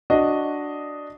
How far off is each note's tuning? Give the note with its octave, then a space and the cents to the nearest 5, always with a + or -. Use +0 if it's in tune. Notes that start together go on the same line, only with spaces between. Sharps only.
D4 +0 F#4 +0 D#5 +0